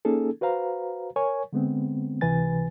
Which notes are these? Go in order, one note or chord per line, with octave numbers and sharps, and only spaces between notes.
A#3 C#4 D#4 G#4 A4
F#4 B4 C5 F5 A#5
A#4 C#5 G#5 C#6
D3 G#3 B3 C4
C#2 C3 E3 B4 G#5 A6